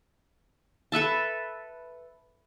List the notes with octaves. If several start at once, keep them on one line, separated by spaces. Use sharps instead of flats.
A4 B4 E5 A5